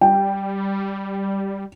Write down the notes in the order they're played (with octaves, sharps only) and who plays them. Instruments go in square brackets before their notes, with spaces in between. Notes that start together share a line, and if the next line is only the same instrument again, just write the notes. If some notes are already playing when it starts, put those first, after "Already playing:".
[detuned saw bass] G3 [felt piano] G5